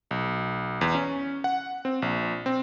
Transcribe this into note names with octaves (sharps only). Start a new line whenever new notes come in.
B1
E2
C#4
F#5
C4
A#1
C4